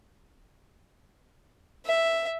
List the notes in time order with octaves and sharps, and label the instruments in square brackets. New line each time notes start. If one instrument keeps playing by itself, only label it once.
[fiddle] E5